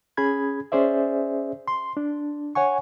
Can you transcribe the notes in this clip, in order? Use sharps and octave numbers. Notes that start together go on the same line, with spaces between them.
C#4 G#4 B5 G#6
C#4 G#4 C5 D5 E5
C6
D4
C#5 F#5 G#5 C#6